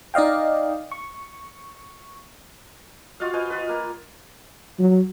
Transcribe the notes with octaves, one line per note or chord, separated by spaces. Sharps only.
D#4 D5 D#5 F5 G5
C#6
F4 F#4 D#5 F5
B4 C5 D#5 G#5
F4 B4
A#3
F#3